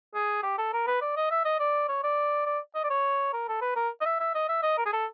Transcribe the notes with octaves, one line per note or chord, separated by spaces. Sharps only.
G#4
G4
A4
A#4
B4
D5
D#5
E5
D#5
D5
C#5
D5
D5
D#5
D5
C#5
A#4
A4
B4
A#4
D#5
E5
E5
D#5
E5
D#5
A#4
G#4
A4